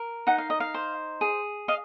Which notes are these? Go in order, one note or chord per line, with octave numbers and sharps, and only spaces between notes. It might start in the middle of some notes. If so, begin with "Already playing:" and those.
Already playing: A#4
D#4 F#5
F5
D#5
F5
C5
G#4
D#5 F5